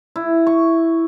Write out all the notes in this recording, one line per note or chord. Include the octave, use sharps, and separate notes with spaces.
E4
C#6